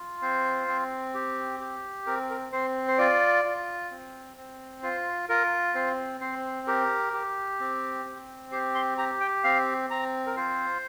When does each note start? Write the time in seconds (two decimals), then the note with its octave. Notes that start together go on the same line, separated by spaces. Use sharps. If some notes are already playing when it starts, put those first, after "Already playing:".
Already playing: F4
0.22 C4 C5
0.68 C4
1.14 G4
1.60 G4
2.06 C4 A#4
2.30 A#4
2.52 C4 C5
2.88 C5
2.98 F4 D5
3.45 F4
3.91 C4
4.37 C4
4.83 F4 C5
5.29 F4 A#4
5.75 C4 C5
6.21 C4 C5
6.67 G4 A#4
7.13 G4
7.60 C4
8.06 C4
8.52 G4 C5
8.75 C6
8.98 G4 A#5
9.20 G5
9.44 C4 F5
9.90 C4 A#5
10.27 A#4
10.36 F4 C5